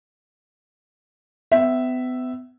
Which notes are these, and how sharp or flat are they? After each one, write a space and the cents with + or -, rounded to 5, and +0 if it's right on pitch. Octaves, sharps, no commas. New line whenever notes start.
B3 +40 E5 +0